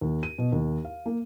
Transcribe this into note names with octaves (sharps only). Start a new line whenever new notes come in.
D#2
D#7
B2
D#2
F5
A#3